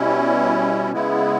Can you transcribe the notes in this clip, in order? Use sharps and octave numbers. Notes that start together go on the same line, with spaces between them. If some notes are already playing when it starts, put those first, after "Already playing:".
Already playing: B2 G3 C#4 E4
C#3 G#3 B3 E4